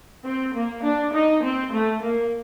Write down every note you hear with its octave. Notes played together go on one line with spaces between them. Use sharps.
C4
A#3
D4
D#4
C4
A3
A#3